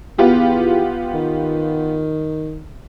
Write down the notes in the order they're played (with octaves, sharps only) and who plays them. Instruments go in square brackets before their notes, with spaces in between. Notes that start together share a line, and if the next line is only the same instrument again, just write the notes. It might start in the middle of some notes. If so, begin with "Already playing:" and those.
[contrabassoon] E2 [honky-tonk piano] B3 F4 G4
[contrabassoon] D#3